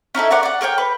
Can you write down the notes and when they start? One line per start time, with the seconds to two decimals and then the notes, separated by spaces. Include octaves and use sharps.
0.15 C#4 D#4 E4 A4
0.31 A#4 C#5 D5 F#5
0.43 D5 F#5
0.61 A4 A#4 C#5 G5
0.78 B4